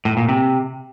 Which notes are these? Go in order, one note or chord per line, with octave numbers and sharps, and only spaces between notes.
A2
A#2
C3